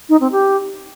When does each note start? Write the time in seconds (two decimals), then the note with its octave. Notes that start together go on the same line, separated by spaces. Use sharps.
0.09 D#4
0.21 C4
0.32 G4